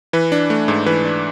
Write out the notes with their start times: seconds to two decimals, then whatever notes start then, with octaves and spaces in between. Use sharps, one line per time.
0.13 E3 B4
0.32 D4
0.50 A3
0.68 G#2
0.86 E3 B4
1.05 D4